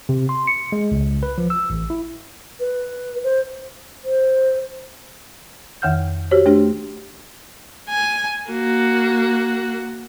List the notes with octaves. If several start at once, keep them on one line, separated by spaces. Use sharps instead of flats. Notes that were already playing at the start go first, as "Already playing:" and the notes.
C3
C6
C#7
G#3
C#2
B4
F3
E6
A1
E4
B4
C5
C5
F2 D#3 E5 F#5 F6 G6
F#4 G4 C5 C#5
A3 D4 G4
G#5
A#3 F#4